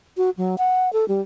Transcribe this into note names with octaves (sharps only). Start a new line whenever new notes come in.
F#4
F#3
F#5
A4
G3